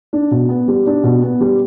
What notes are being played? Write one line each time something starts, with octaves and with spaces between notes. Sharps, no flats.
D4
B2
B3
G3
D4
B2
B3
G3